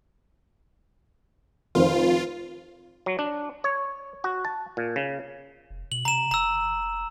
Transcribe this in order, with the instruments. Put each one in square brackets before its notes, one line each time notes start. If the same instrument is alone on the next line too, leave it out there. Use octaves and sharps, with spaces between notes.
[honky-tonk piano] F1 D#3 C5 [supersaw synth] F4
[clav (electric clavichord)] F#3
D4
C#5
F#4
A5
A#2
C#3
[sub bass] F1
[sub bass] B2 [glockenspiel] F#7
[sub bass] C3 [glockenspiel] A#5 E7
[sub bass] F1 [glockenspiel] A#5 E6